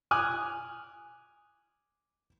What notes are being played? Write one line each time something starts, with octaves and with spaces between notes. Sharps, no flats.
G#5 D6 D#6 F6 F#6